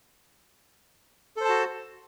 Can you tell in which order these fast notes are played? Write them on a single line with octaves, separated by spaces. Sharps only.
A4 C5 A5 F#4